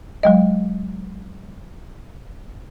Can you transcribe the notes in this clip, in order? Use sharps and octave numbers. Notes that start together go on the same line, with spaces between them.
F#3 G#3 D#5